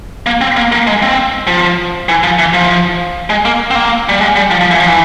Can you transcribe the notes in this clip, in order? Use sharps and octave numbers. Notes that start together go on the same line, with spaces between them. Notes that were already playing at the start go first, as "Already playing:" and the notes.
A#3
C4
A#3
A#3
G#3
C4
F3
E3
F3
E3
F3
G#3
A#3
C4
A#3
G3
G#3
G3
F3
F3
E3
F3
E3